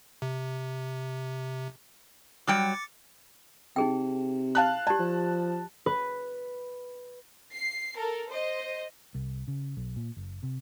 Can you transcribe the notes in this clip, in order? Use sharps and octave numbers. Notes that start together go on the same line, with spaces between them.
C3
F#3 G3 G5 D6 A6 C#7
C3 D#4 G#4 G5
F5 A5 F#6
G4 D5 A5
F3
B4
C7
A4 A#4
C5 D#5
C2
C#3
B1
A#2
F#1
C3